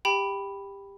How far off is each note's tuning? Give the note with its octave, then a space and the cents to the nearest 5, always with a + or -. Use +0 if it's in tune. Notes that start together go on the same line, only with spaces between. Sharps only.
G4 +20 G5 +0 B5 +0